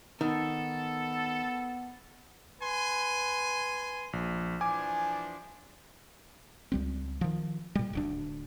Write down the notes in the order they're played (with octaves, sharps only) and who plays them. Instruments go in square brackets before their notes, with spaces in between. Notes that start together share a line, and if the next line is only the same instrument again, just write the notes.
[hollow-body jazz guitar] D#3 [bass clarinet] B3 [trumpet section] A4
[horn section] B4 G#5 C6
[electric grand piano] A#1
[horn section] E3 F3 D4 [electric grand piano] G#5 D6
[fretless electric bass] C#2 G3 C4
D#3 F3
A#2 G3
D1 D2 D4